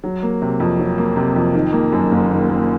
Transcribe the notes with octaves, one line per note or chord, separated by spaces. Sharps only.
F#3
A#3
C3
F2
F#3
A#3
C3
F2
D#3
A#3
F#2
F#1
D#3
A#3